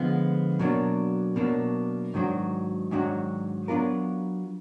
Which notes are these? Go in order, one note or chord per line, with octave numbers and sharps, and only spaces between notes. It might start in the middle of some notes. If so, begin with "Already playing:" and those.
Already playing: D3 F3 G#3 B3
B2 F#3 A#3 D4
B2 F#3 A#3 D4
G#2 D#3 F#3 D4 F#4
G#2 D#3 F#3 D4 F#4
F#3 B3 D4 F4 A#4